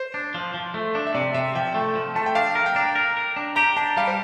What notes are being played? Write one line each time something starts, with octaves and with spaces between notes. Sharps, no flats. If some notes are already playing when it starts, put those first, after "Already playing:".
Already playing: C5
D4
F3
F3
A3
D4
E5
C3 D5
C3 E5
F3 G5
A3
F3
A3 A5
G5
D4 F5
A#4
G5
D4
A#4
A#4
D4
G4 A#5
D4 A5
G3 F5
C5